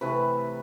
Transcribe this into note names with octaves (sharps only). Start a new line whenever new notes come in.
C3 E3 A3 B4